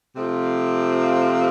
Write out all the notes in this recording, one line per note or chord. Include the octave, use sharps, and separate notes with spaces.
C3 F3 A3 C4 F4